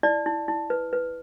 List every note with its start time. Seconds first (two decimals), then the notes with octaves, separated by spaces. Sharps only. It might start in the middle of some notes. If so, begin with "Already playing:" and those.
0.03 E4 D5
0.26 E4
0.48 E4
0.70 B4
0.93 B4